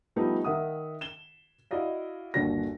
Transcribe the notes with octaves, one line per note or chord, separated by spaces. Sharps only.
F3 G3 A3 B3 D#4
D#3 E5 F#5 D#6
E7 G7
E4 F#4 D5 D#5 F5
G1 D#2 D3 F#4 D5 A#6